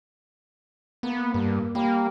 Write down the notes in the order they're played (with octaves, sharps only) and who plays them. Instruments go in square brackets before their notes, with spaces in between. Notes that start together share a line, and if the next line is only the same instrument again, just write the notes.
[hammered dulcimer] A#3 [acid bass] B3
[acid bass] G2
[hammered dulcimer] G3 [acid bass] A#3